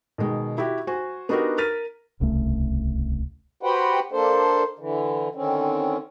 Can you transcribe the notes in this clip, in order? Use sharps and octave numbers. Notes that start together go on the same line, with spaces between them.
B2 D#3 G#3
E4 F#4 G4
F#4 C5 G#5
B3 D4 D#4 F#4 G4 A#4
A#4 F6 A6 B6 D#7
D1 C2 C#3 A3
F#4 G4 B4 C5 F#5 G5
A#3 D4 A4 C5
D3 E3
D3 D#3 C4 C#4